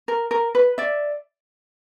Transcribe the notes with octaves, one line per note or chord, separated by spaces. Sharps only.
A#4
A#4
B4
D5 E5